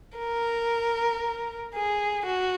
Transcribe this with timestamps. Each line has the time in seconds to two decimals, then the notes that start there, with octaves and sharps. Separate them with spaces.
0.17 A#4
1.74 G#4
2.25 F#4